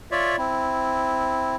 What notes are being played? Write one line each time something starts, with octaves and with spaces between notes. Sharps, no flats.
F4 C#5 D5 E5
C4 E4